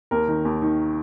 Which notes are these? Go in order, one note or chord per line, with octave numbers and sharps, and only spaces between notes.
D#2 A#4
D#3
D#2
D#3